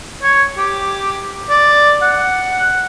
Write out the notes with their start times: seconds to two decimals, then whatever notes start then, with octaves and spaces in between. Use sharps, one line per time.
0.23 C#5
0.57 G4
1.49 D5
2.02 F#5